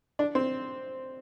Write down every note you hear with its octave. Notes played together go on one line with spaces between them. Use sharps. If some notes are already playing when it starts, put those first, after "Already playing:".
D4
C4